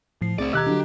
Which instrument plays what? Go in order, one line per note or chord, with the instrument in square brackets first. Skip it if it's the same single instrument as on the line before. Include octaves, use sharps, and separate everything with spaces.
[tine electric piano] A2 C7 [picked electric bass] F3
[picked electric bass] C2 A3 C4 [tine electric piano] G#4 [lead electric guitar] C5 D5
[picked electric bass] B2 D#3 [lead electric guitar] G4 [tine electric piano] D#5 A#5 [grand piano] E6 F#6 G#6
[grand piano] D3 F#3 [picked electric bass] D4